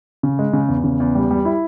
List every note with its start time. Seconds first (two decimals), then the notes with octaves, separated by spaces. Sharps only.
0.23 C#3
0.39 G#3
0.53 C#3
0.69 E2
0.84 C#3
1.00 E2
1.15 G3
1.31 G3
1.45 E4